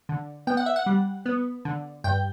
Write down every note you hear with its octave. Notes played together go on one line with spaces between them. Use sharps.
D3
B3 G5
F#5
E5
F#5
G3
B3
D3
G2 G5